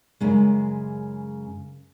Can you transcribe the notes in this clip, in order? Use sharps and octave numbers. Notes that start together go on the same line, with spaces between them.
F#2 C#3 G#3